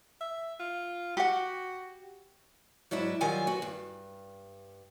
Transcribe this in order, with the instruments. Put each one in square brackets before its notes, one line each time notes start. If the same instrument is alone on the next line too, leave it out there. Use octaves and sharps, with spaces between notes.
[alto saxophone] E5
F4
[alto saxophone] F#4 [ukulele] G4 F#5
[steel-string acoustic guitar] G#2 F#3 D4 E4
D#3 F#3 G3 F4 G4 G#5
B3 F#4
G2